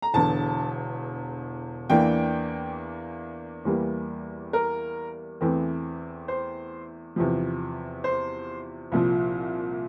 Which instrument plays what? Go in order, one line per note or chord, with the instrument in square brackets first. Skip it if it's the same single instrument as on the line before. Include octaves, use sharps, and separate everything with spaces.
[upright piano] A#5
E1 E2 D3 A5
E2 E3 A#3 D4 G5
E2 E3 G3 A#3
A#4
E2 E3 A3 C4
C5
E2 C3 F3
C5
C2 A#2 F3